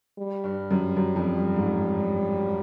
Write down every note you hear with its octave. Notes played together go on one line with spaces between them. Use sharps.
G3
G2
F#2
F#2
F2
G2
G#2